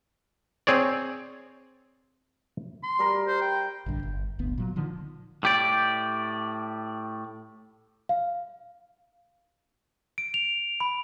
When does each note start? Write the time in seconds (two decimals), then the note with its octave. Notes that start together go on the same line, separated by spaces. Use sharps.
0.67 C4 G#4 C#5 D5
2.83 C6
2.99 G3 A#4
3.27 C5
3.42 G5
3.86 A#1 G2 D3
4.03 G1
4.39 D1 G1 D2 B3
4.58 A#2 F#3
4.76 D3 D#3 F3
5.43 A2 G4 D5
8.09 F5
10.18 D7
10.34 F7
10.80 B5